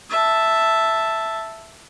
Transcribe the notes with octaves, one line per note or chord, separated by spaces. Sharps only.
E5 A5